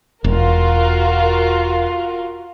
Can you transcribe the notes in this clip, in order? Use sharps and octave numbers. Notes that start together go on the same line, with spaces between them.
E1 F4 F#4 A#4